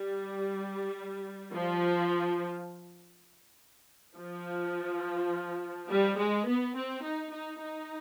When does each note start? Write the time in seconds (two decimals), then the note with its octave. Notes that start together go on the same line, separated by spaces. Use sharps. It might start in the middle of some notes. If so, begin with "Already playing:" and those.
Already playing: G3
1.55 F3
4.16 F3
5.90 G3
6.18 G#3
6.48 B3
6.76 C4
7.05 D#4
7.34 D#4
7.64 D#4